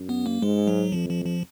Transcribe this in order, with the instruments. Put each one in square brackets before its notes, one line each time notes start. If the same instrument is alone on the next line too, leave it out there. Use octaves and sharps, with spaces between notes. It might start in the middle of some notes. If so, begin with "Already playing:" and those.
Already playing: [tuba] F#2
[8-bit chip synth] B3
A#3
[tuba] G#2 [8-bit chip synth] G#3
[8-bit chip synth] F#3
[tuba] F2 [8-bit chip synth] F3
[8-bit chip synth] F3
F3